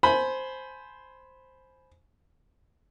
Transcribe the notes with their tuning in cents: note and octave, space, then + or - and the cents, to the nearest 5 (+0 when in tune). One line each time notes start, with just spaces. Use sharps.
C5 +0 G#5 +25 B5 +0